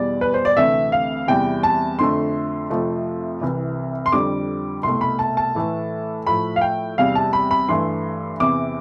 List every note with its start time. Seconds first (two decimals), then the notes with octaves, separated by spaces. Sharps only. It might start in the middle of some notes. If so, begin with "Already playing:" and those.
Already playing: E2 B2 G3 D5
0.21 B4
0.34 C5
0.45 D5
0.57 D2 C3 E3 A3 E5
0.92 F5
1.27 E2 C3 E3 G3 G5
1.63 A5
1.99 F2 D3 A3 C6
2.70 F2 C3 F3 A3
3.41 C2 C3 E3
4.06 C6
4.12 F2 D3 G3 D6
4.83 C2 B2 A3 C6
5.01 B5
5.19 A5
5.37 A5
5.55 A2 E3 A3
6.27 A2 F3 A3 B5
6.56 F5
6.61 G5
6.98 E2 C3 G3 F5
7.15 A5
7.33 B5
7.51 B5
7.69 G2 E3 A3 C6
8.40 E2 C3 E3 D6